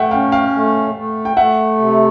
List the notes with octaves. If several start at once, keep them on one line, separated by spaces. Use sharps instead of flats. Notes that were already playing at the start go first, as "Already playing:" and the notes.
Already playing: A3 E5 F#5 G5
C#4 F5 G5
F5 G5
A3
A3
G5
A3 E5 F#5
C3